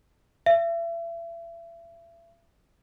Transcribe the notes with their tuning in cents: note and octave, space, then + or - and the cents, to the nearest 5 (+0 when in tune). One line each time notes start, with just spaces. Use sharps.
E5 +35